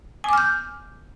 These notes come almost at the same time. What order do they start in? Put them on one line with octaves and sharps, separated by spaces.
G#5 D6 F6 G6